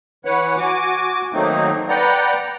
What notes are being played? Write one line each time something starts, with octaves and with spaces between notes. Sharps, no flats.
E3 B4 C#5 F#5
F#4 G#5 D6
D#3 F#3 A3 A#3 C4 D#4
B4 D5 F#5 G5 A#5